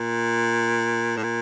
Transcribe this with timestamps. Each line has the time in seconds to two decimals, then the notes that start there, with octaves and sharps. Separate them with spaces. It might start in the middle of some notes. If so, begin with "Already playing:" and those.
Already playing: A#2
1.17 A2
1.23 A#2